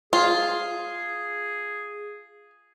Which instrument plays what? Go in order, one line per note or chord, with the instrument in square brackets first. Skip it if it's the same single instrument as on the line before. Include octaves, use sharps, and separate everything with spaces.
[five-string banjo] F4 [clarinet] G#4